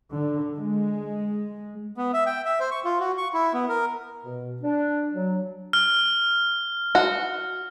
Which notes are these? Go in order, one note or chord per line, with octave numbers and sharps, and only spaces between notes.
D3
G#3
B3
E5
G5
E5
C5
C#6
F4
F#4
C#6
E4
B3
A#4
B2
D4
F#3
F6
F#4